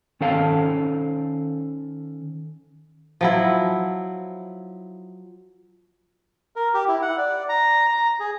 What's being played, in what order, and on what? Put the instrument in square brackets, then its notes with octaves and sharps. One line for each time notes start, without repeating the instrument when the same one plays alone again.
[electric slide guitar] D#3 C#4 A4 C5 F5 A5
[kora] F3 F#3 E4
[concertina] A#4
G4
E4
F#5
D5
A#5
A#5
G#4